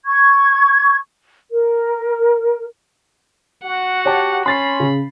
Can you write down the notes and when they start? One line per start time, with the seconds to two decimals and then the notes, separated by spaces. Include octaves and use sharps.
0.06 C#6 G#6
1.51 A#4
3.64 F#4 F#5
4.05 G4 C#5 A5
4.46 C#4 B5 C6 A6 C7
4.80 C#3